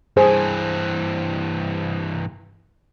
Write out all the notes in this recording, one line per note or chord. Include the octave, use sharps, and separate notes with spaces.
G2 E3 G#4 C5